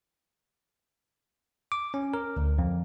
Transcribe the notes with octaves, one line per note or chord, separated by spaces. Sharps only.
D6
C#4
A#4
D2
F2